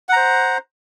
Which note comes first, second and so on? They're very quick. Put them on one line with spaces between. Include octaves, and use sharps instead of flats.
F#5 A#5 C5